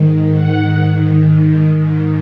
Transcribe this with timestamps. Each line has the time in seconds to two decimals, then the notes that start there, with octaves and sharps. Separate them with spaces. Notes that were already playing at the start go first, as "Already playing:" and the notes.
Already playing: G#2 D#3
0.34 F#5
1.74 G#2 D#3